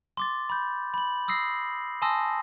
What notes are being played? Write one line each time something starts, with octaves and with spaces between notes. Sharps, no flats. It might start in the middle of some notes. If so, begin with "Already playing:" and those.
C6 D6 A6
B5 G6
B5 F#7
D#6 E6 A#6 C7
G#5 A5 C6 D#6 E6 A#6